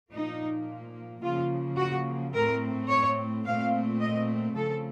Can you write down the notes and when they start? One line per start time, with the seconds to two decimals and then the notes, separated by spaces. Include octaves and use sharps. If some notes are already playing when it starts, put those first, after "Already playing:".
0.11 A#2 F3 A#3 D#4
1.22 C#3 F3 A#3 F4
1.77 F#4
2.33 A2 A3 C4 A#4
2.88 C#5
3.44 A#2 A3 C4 F5
3.99 D#5
4.55 C#3 F3 A3 C4 A4